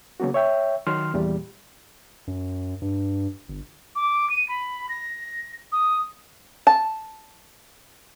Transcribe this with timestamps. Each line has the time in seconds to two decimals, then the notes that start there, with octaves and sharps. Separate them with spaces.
0.20 C#3 F#3 A#3 B3 F#4
0.34 C#5 E5 G5
0.87 D#3 F#3 C6 F6
1.14 E2 A#2 G3
2.27 F#2
2.82 G2
3.48 G1
3.95 D6
4.30 D#7
4.49 B5
4.89 A#6
5.72 D#6
6.67 A5